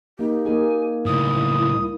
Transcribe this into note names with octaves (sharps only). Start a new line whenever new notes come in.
A#3 D#4 G4
A#3 D#4 G#4 G#5
C#2 A2 E4 D#6